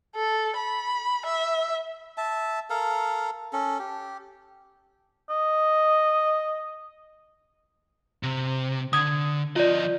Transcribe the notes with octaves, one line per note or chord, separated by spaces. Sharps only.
A4
B5
E5
E5 A5
A4 A#4 F5
C#4 A4
G4
D#5
C3
D3 D#6 G#6
F3 F4 D5 D#5